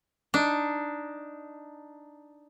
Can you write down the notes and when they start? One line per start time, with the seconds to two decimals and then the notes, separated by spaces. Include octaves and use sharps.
0.34 D4 D#4